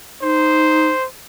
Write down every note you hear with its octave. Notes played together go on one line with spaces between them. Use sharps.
D#4 C5